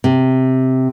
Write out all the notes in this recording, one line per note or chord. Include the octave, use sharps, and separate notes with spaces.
C3